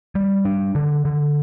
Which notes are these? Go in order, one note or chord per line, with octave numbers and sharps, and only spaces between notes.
G3
D4
D3
D3